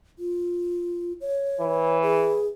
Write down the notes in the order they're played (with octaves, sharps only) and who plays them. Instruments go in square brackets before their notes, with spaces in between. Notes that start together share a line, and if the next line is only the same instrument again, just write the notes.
[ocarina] F4
C#5
[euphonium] E3
[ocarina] G#4